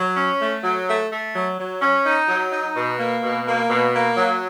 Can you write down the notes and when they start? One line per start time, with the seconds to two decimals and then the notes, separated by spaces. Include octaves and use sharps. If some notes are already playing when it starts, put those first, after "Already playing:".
Already playing: F#3
0.17 C#4
0.40 A3
0.63 F#3
0.87 A3
1.10 A3
1.34 F#3
1.58 F#3
1.81 C#4
2.04 D#4
2.28 F#3
2.51 D#4
2.74 B2
2.98 A#3
3.22 B2
3.45 A#3
3.69 B2
3.92 A#3
4.16 F#3